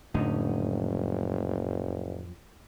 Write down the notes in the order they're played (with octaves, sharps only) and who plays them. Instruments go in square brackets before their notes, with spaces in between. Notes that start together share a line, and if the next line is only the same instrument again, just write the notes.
[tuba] F#1 [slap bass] F2 F#3 C#4 [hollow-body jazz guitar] A2 D3 D#4